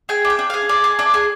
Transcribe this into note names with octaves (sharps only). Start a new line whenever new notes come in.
G#4 G5
D4
G5
D4
G#4 F5
G#4 D5
G#4
D4 D5
G#4